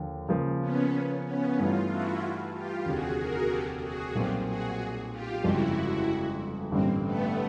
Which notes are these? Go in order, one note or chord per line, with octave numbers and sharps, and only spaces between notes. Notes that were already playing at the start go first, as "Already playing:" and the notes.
Already playing: D#2 D3 F3
C#3 F3 A#3
B3 C#4
B3 C#4
G2 E3 A3 D4 D#4 F4
E4 F#4
F4 G4
F1 D#2 D3 F#4 G#4
G#4 A#4
G4 A4
F#4 G#4
B1 A#2 G3 C4 F4 G4
F#4 G#4
F4 G4
G1 F2 C#3 F3 G#3 E4 F#4
A1 G2 D3 G3 A#3 C4
A3 B3